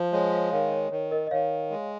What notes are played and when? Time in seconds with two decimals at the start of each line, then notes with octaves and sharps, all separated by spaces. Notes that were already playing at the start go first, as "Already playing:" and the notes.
Already playing: F3
0.12 G#3 C#5
0.33 C#5 F5
0.52 D#3 C#5 F5
0.68 D#5
0.72 C#5
0.91 D#3 C#5
1.11 A#4 D#5
1.27 D#5
1.31 D#3 C#5 F5
1.70 G#3